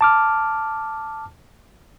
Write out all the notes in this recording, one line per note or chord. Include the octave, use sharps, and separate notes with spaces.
A5 D6 F6